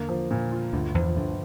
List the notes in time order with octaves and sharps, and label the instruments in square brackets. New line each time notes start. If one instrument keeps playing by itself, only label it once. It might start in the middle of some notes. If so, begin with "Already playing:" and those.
Already playing: [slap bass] E2 [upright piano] D3 A#3
[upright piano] F3
A#2
F4
[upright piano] G1 [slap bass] D2 D3
[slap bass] E2 E3 [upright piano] F3
[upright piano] G1 [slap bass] D2 D3